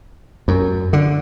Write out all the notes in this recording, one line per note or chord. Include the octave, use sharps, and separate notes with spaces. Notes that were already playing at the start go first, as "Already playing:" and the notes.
F#2
D3